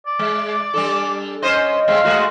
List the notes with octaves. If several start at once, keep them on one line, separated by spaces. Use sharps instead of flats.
D5
G#3
G3 D4 A4
C#4 C5 D#5
G3 G#3 C4 F5
G#3 A3 F#4